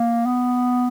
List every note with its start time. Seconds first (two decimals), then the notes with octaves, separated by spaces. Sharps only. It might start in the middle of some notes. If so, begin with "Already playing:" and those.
Already playing: A#3
0.26 B3